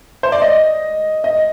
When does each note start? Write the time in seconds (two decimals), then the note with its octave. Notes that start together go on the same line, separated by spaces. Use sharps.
0.23 C5
0.32 D5
0.42 D#5
1.24 D#5